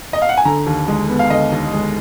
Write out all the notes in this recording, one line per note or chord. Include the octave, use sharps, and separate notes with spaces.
D#5
F5
F#5
G#5
D3 A#5
D#2
G#3
B3
F5
D3 D#5
D#2
G#3